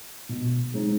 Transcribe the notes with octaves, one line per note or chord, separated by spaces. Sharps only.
B2
G#3 C4 D#4